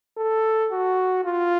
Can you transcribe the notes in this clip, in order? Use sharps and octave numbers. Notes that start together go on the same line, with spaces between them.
A4
F#4
F4